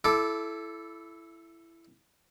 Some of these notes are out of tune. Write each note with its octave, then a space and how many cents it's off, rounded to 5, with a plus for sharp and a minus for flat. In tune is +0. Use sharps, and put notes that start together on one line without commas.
E4 +10 A4 -15 D6 +0